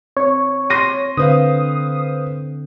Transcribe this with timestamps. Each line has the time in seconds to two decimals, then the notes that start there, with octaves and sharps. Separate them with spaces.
0.17 C4 C#5
0.70 C6 A#6 D#7
1.17 D3 C4 B4 C5 F5 D#6